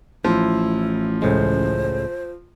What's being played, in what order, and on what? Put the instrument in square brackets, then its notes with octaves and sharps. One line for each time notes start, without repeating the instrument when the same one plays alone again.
[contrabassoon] A1 [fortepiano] F3 [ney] E4
[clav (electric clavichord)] C#2 A2 G#3 [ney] C5